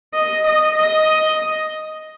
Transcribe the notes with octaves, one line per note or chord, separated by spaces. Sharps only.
D#5
D#5
D#5